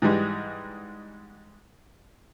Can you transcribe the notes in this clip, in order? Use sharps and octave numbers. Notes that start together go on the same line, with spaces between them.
G#2 E3 G3 G#3